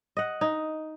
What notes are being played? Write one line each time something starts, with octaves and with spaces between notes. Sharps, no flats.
D#5 F#5
D#4